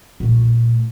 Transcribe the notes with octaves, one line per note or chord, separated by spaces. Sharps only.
A#2 A3